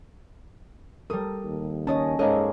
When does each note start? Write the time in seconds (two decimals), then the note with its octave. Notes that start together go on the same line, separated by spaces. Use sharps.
1.10 G3 A4 A#4 D#6
1.44 D#2
1.87 C#4 C#5 D#5 A5 D#6
2.19 G#2 G#3 A#3 C#4 A4 D#5